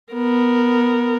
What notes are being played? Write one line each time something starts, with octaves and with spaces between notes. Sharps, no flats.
B3 A#4